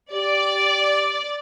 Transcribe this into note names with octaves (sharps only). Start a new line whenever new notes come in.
G4 D5